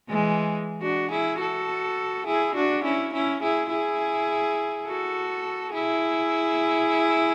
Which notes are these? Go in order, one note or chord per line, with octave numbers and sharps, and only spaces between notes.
E3 G#3
D4 F#4
E4 G#4
F#4 A4
E4 G#4
D4 F#4
C#4 E4
C#4 E4
E4 G#4
E4 G#4
F#4 A4
E4 G#4